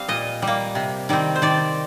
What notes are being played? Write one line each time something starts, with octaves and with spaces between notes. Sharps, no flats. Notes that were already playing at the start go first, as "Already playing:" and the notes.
Already playing: G3 C4 F5
A#2 D#5
G3
A#3
C3
D#3 G3 C4
C5
D#3 D5